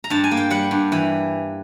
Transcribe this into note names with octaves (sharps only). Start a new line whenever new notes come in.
A#5
G2 A5
G#5
A#3
G5
G3 F#5
G2
E3